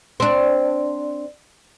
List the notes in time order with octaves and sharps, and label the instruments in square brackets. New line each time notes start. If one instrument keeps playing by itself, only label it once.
[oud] C4 D4